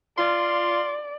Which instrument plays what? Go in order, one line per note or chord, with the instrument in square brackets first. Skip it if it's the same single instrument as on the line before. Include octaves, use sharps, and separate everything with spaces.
[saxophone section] F4 [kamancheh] D5 [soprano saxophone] C6